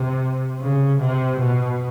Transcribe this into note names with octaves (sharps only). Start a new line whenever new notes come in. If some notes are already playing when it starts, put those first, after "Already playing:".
Already playing: C3
C#3
C3
B2